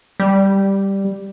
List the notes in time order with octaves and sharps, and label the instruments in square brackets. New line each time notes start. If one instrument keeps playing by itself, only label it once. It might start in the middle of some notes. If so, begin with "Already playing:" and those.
[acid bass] G3